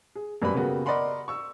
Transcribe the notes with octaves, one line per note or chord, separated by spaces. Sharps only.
G#4
F#2 G3 A#3 B4 B5
C#3 A#3 B3 F#4 G4
A#4 D5 D#5 F#5 B5 C6
C#6 E6